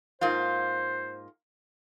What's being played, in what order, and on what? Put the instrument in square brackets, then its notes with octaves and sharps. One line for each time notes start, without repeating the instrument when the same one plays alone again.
[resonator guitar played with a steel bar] G#2 A#3 F4 [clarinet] C5